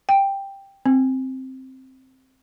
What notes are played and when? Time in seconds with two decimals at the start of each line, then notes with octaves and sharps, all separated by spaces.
0.09 G5
0.86 C4